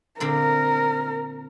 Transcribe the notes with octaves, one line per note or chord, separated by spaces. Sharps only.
A#2 D3 C4 A#4